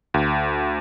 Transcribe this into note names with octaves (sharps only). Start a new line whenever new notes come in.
D2